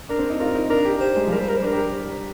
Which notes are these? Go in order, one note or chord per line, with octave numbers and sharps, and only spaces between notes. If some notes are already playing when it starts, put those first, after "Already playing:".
D4 A#4
C4
D#4
F4 A#4
D#4
D4 A#4
G4
G4 C5
G#3
F3
G3 A#4
C5
A#4
C5
D4 A#4
G4